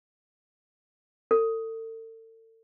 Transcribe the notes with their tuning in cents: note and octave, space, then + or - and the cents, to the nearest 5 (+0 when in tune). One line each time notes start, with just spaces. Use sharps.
A4 +40